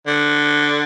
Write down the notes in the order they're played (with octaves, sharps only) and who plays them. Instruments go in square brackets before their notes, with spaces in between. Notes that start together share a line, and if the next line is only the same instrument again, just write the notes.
[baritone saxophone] D3